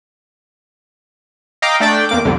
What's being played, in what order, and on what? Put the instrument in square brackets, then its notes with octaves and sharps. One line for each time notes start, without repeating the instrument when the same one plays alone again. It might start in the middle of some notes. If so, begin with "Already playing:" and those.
[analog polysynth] D#5 F5 G5 A#5 D6
A3 D4 D5 G5
E2 A#3 D6
C2 F2 D3